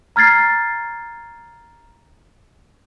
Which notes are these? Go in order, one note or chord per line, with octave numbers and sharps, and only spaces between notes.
A#5 F6 G#6 A6 C7